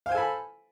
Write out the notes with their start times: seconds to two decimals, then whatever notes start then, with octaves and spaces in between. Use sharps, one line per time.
0.06 F5
0.09 C5
0.12 G#5
0.14 A4
0.17 B5